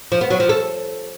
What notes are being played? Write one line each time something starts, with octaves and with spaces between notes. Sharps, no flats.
F3
B3
F#3
F3
A4